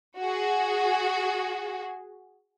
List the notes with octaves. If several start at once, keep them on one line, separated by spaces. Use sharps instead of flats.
F#4 G#4